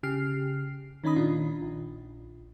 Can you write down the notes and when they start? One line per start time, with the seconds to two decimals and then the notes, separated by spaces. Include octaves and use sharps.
0.03 C#3 G4 F6 C7
1.04 D#3 C#4 D#4 B5 D#6
1.16 A#2 D#3 D4 F4
1.62 A#1